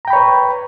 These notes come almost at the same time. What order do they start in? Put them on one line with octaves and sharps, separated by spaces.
A#5 G5 B5 C#5 B4